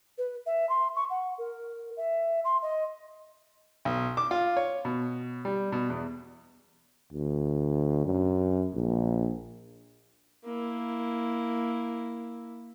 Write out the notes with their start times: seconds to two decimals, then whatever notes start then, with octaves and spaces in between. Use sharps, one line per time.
0.18 B4
0.46 E5
0.69 C6
0.96 C#6
1.10 F#5
1.38 A#4
1.97 E5
2.45 C6
2.62 D#5
3.85 B1
4.17 D6
4.31 F4
4.57 C#5
4.85 B2
5.45 G3
5.72 B2
5.90 E2
7.13 D2
8.06 F#2
8.75 A#1
10.45 A#3 E4